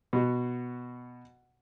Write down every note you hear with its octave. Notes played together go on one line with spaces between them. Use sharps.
B2 F#4